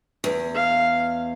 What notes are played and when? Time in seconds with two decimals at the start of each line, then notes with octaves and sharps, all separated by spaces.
0.24 E2
0.55 F5